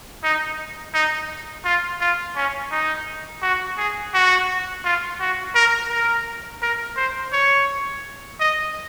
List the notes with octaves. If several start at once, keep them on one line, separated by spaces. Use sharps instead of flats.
D#4
D#4
F4
F4
C#4
D#4
F#4
G#4
F#4
F4
F#4
A#4
A#4
A#4
C5
C#5
D#5